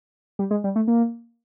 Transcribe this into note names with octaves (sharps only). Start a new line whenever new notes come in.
G3
G#3
G3
A3
A#3